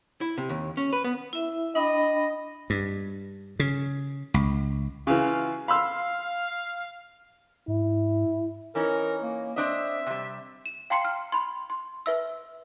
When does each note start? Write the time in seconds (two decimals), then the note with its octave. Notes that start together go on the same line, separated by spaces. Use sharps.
0.21 E4
0.38 C3
0.49 D#2
0.77 C#4
0.93 B4
1.04 B3
1.33 E4 E5
1.75 D4 D#5 G5 B5
2.70 G2
3.60 C#3
4.34 C#2
5.07 C#3 E3 F4 F#4 F5
5.68 F5 B5 C6 E6
7.68 G#2 E4
8.75 E3 C#4 D#4 A#4
9.23 A#3
9.56 C4 D4 D#5 E5
10.07 C3 G3
10.66 E7
10.90 F5 G5 A#5 C6 C7 C#7
11.05 F6
11.32 B5 C6
11.70 C6
12.06 B4 E5 E6